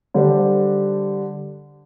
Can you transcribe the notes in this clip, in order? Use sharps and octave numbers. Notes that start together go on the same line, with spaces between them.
D3 G3 D4 G4 C5